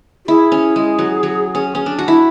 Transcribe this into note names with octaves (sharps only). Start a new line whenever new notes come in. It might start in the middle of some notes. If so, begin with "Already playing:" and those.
F#4
E4 G#4
C#4
G#3
F#3
F#3
C#4
C#4
D4
F#4
E4